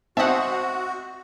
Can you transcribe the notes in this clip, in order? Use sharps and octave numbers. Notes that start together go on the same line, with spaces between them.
C4 F#4 C5 D#5 E5 F#5 A5